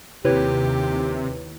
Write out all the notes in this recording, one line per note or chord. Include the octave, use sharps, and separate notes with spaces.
D#2 C3 E4 G4 B4 C#5